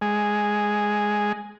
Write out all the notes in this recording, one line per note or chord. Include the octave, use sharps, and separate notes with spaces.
G#3